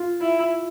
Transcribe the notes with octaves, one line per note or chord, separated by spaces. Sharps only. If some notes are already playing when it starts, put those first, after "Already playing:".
Already playing: F4
E4